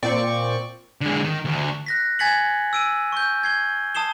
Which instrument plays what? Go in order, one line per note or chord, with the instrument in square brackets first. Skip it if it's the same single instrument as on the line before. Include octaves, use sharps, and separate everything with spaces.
[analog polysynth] A#2 C4 D5 C#6
[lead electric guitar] D3 G#3
D#3
D2
[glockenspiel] F#6 A#6 B6
G#5 G#6 A6 B6 C#7 F#7
E6 D7 D#7
C#6 G6
G#6 C7 G7
A5 D#6 C7 E7 G7